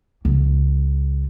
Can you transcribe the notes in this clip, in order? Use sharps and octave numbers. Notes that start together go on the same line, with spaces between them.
C#2